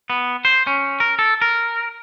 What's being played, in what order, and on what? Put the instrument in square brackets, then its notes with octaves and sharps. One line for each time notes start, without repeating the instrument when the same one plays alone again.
[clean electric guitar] B3
C5
C#4
A#4
A4
A#4